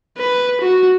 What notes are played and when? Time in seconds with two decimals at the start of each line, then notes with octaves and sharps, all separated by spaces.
0.18 B4
0.61 F#4